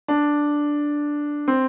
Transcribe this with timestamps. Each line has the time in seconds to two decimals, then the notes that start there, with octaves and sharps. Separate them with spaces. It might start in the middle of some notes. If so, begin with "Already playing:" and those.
0.08 D4
1.48 C4